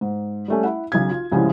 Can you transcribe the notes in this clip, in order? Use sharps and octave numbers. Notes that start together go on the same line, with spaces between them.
G#2
G3 A3 C#4
E4 F#5
B1 C#3 G#6
F4
C2 A2 C#3 F3 G3 G#3